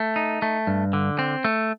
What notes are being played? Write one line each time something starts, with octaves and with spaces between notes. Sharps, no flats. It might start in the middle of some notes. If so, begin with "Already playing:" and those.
Already playing: A3
D#4
A3
G2
D3
C4
A3